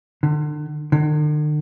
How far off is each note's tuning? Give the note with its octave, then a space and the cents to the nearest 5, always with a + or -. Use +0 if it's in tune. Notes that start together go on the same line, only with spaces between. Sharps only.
D3 +35
D3 +45